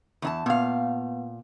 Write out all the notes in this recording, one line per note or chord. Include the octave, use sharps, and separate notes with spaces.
E2 D#4 A5
A#2 B3 F5